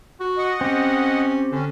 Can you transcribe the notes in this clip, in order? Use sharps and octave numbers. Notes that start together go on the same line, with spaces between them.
F#4
D#5 F#5
C4 C#4 G4
D3 C#4